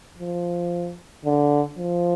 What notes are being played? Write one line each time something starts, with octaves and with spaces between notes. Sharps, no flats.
F3
D3
F3